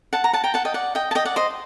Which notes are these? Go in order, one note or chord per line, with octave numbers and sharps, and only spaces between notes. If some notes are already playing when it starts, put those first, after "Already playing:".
F#5 A5
A#5
F#5 A5
G5 A#5
F#5 A5
D#5 G5
D5 F#5
D#5 G5
A5
D#5 G5
D5 F#5
C5 D#5